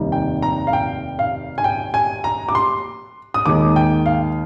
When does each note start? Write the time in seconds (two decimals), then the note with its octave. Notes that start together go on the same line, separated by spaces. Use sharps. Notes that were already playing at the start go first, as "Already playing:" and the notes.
Already playing: F1 D#2 D#3 G3
0.12 G5
0.42 A#5
0.67 F5
0.73 G5
1.19 F5
1.58 G#5
1.64 G5
1.94 G#5
2.24 A#5
2.49 D6
2.55 C6
3.34 D#6
3.46 D#2 D#3 G#3 D6
3.76 G5
4.06 F5